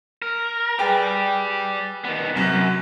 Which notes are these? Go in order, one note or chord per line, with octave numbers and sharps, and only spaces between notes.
A#4
G4 G#4 B4 D5 G5
D#3 B3
F#2 C3 F#3